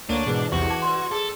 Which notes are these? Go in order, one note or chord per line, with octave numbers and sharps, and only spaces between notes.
D2 A#3 D4 C#5 D#7
G#2 B2 E3 G#4 A#4
B1 E2 C3 F#4 C#6
A5 D6 G#6
B4 D5 C6
G#4 A4